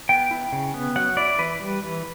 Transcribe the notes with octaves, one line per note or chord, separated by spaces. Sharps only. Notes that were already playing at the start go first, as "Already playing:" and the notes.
B3 G5
E4
C#3
B3
F#3 F#5
E4 D5
E3 B4
G3
E3